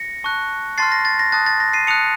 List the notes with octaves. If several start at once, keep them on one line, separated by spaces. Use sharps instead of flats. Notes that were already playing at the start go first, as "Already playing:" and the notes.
Already playing: A#6 C#7
A5 C#6 F#6
A5 C6 F6 A6 C7
A#6
A6
A#6
A5 D#6 F#6 A6
A6
A#6
C7 D#7
A5 D#6 F#6 C#7 F7